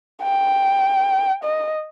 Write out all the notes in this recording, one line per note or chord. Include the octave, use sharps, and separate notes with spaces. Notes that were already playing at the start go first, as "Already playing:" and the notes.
G5
D#5